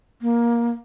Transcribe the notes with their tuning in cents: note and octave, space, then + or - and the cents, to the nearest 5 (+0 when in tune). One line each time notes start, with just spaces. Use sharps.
A#3 +15